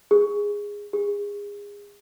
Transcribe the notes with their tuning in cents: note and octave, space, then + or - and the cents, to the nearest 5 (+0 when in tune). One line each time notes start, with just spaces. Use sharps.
G#4 -15
G#4 -30